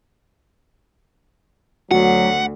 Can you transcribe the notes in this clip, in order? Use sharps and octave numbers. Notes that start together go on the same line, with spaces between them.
D2 F#3 F#4 F#5